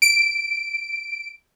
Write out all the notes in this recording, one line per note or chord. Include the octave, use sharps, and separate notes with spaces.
D7